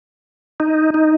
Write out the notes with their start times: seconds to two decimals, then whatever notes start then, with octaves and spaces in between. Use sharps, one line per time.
0.60 D#4
0.94 D#4